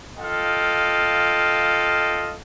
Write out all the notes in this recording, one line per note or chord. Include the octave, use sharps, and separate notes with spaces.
F4 A4 D#5 F5 G5